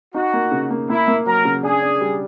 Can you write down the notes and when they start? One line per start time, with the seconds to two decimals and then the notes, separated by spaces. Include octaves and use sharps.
0.14 D#4 F#4
0.33 A#3
0.52 C#3
0.70 A#3
0.89 A#3 E4
1.08 A#3
1.26 F#3 A#4
1.45 C#3
1.63 D4 G#4
1.82 D4
2.01 G3